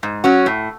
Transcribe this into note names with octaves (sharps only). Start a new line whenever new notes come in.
G#2
F#3 C#4 F#4
A2